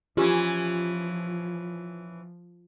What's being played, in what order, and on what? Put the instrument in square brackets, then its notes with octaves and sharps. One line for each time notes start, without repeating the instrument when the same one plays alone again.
[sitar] E3 C#4 E4 [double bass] F3 [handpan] F4 [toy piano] G4